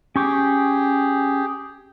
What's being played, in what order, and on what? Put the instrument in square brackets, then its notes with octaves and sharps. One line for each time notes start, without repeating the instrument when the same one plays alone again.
[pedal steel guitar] C#4 C#6 D6 [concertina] G4 G#4 G5